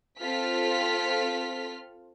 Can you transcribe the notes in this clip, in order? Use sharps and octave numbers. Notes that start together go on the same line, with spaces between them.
C4 F4 A4 F6 B6